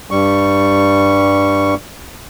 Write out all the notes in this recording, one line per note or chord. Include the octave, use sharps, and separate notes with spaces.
G2 G3 C#6